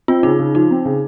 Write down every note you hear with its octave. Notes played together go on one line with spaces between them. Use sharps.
C4 F4
C#3 D#4
C#3
F3 D#4
C4
C#3